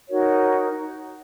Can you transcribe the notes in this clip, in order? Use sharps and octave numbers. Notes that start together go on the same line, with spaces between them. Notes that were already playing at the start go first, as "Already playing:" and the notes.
D#4 F#4 A#4 C#5